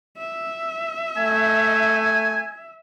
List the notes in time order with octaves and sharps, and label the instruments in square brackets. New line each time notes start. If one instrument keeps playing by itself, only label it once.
[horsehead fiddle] E5
[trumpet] A3 [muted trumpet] G#5